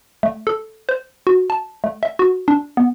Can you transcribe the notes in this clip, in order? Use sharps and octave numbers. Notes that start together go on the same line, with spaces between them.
A3
A4
C5
F#4
A5
A3
E5
F#4
D4
B3